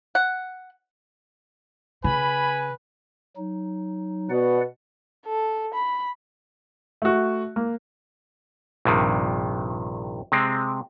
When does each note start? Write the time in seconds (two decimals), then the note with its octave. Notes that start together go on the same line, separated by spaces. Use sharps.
0.15 F#5
2.04 C#3 B4 G#5 B5
3.37 F#3 D#4
4.30 B2 B4 D5 F#5
5.26 A4
5.75 B5
7.02 A3 F#4
7.56 A#3
8.85 A#1 G2 C3 D#3
10.32 C3 G#3 C4